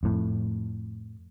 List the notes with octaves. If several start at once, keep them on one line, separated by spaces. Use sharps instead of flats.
F2 A2